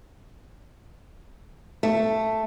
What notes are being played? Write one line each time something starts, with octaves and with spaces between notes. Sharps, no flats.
A3